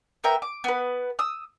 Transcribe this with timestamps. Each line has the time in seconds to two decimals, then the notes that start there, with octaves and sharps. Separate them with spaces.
0.24 B3 A#4 E5 G5
0.42 D6
0.64 B3 B4
1.19 D#6 E6